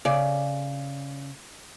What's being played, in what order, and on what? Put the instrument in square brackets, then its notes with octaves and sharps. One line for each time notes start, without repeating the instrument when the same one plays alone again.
[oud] C#3 D5